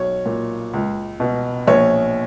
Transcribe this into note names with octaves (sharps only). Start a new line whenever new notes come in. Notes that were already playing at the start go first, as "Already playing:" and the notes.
Already playing: B1 C#5
A#2
C#2
B2
A#1 C#5